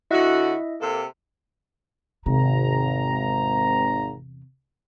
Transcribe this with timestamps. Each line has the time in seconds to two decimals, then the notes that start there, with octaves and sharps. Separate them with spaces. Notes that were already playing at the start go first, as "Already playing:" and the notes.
0.11 D3 E4 F#4 D#5 E5
0.80 C3 A#3 A4
2.26 G#1 E2 C3 A#5